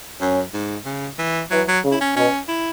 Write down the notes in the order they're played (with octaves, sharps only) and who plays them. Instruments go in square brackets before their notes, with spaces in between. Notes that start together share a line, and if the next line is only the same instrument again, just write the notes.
[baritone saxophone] F#2 [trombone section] C#4
[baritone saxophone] G#2
C#3
E3
[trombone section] E3 [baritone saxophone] F#3
[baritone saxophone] F#3
[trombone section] C#3
[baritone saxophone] E4
C#4
[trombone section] B2 [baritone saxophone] C#4
[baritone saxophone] E4